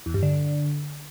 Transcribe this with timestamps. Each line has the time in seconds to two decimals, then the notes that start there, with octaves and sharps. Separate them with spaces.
0.06 E2
0.14 G2
0.23 D3